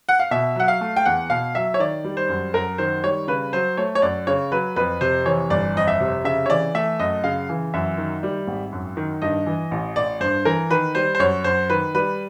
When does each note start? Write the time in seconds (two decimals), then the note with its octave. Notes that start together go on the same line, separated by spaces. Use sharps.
0.09 F#5
0.20 F5
0.31 B2 E5
0.56 F#3 F#5
0.68 F5
0.81 A3
0.97 G5
1.06 E2 F#5
1.30 B2 F5
1.55 F#3 E5
1.74 C#5
1.79 D#3 D5
2.04 G3
2.17 C5
2.29 F#2
2.54 F#2 A#4
2.78 D#3 C5
3.03 G3 C#5
3.28 C#3 B4
3.53 F#3 C5
3.77 A3 C#5
3.95 C#5
4.02 F#2 D5
4.27 C#3 C#5
4.52 F#3 B4
4.76 F2 B4
5.01 C3 C5
5.26 E3 C#5
5.50 G1 D5
5.76 F2 D#5
5.88 E5
6.00 C3
6.24 C#3 E5
6.46 C#5
6.50 E3 D5
6.75 A3 E5
6.99 F#2 D#5
7.23 C#3 F5
7.49 E3
7.74 F#2 E5
7.98 D#3
8.23 G3
8.47 G#1
8.72 F#2
8.97 D#3
9.22 G2 D#5
9.46 E3
9.71 A1
9.96 A1 D5
10.20 G2 C5
10.45 E3 A#4
10.70 D#3 B4
10.95 G3 C5
11.15 C5
11.19 F#2 C#5
11.44 F#2 C5
11.70 D#3 B4
11.95 G3 B4